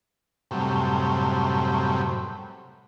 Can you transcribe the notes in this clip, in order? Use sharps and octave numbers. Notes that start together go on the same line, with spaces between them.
F#2 A2 C3 G3